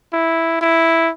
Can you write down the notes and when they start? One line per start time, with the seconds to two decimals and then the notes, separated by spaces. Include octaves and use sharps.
0.14 E4
0.61 E4